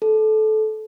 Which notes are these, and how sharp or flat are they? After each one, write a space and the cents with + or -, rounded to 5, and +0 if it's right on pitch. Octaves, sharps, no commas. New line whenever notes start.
A4 -20